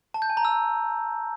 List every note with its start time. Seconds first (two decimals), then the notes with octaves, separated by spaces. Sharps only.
0.14 A5
0.22 G6
0.30 G#5
0.37 A#5
0.45 E6